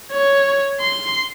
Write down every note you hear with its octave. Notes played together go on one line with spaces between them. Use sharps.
C#5
C6